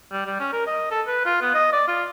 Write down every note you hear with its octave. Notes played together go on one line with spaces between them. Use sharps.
G3
G3
C#4
A#4
D#5
A4
B4
F4
B3
D#5
D5
F4